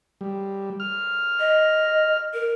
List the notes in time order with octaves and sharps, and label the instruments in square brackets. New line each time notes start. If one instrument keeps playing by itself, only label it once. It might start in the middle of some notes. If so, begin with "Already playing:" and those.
[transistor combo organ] G3
F6
[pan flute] D#5
A#4